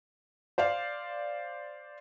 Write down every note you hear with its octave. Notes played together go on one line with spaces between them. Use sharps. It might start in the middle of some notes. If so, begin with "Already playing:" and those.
C5 D5 F5